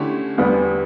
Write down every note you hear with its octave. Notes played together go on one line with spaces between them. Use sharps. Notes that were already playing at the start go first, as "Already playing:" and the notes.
Already playing: D3 A3 C#4 E4 G4
E2 D3 G3 B3